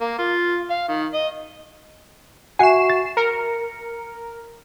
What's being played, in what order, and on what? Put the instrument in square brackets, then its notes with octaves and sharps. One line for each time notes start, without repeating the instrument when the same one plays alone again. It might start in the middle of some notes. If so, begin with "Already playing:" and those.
[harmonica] A#3
F4
F5
D#3
D#5
[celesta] F#4 E5 C#6 [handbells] F#5 G#5 [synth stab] C7 E7
[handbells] A6
[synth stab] A#4 [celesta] C#7